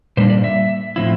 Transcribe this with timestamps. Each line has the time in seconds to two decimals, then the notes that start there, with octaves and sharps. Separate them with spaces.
0.17 A#2 G3 A#3 D4 C5
0.30 D5
0.44 E5
0.96 A2 F3 C4 E4